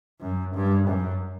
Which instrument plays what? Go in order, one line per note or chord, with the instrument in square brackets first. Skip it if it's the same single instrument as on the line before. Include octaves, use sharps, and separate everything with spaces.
[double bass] F#2
G2
F#2